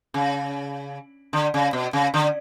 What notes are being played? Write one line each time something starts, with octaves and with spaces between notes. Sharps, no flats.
C#3
D3
C#3
B2
C#3
D3